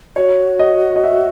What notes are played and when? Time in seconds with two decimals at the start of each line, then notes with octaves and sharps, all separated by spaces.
0.16 F#4 C#5
0.59 D#5
0.96 D#5
1.04 E5